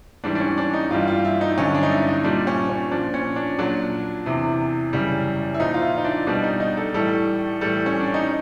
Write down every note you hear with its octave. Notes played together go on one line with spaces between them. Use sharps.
G#2 E3 G3 D4
D4
C#4
D4
D#4
G2 E3 G3 F4
F4
E4
D#4
G2 D3 F#3 C#4
D4
D#4
E4
D#4
A#2 G3 D4
C#4
C#4
A#2 F3 D4
C#4
D4
A#2 F#3 D4
E2 C3 E3
F#2 C#3 E3 G3
E4
A#2 F3 D#4
F4
E4
D#4
D4
B2 G3 D4
D#4
D#4
A4
A2 E3 G3 A4
A2 E3 G3 A4
C#4
D4
D#4